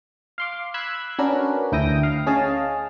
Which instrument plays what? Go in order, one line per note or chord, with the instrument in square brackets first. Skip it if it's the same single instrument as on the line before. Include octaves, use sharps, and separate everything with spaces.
[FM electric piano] F5 C6 D6
B5 E6 F#6 G#6
C#4 D4 F#4 A#4 B4
D2 E4 G5 D#6 A#6
F5
C#4 G#4 D#5 F5 A5